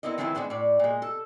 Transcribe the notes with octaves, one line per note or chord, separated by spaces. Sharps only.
B3 C4 E4 A#4 D#5
D#3 F3 G#3 C4 E4 B4
G#3 A3 B3 D4 C5
A2 D5
A#2 G#3
A4